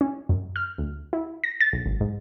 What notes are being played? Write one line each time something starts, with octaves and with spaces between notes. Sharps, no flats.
C#4
F#2
F6
D2
E4
A#6
A6
B1
G#1
G#2